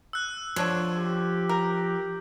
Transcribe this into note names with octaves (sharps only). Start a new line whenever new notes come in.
E6 F#6
D3 F3 D4 C#5
G4
A#4